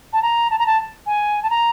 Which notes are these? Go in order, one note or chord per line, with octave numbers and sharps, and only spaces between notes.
A5
A#5
A5
A#5
A5
G#5
A5
A#5